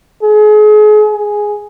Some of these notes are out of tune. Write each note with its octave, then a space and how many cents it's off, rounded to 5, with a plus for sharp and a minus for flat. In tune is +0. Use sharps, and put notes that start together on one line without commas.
G#4 +35
G#4 +0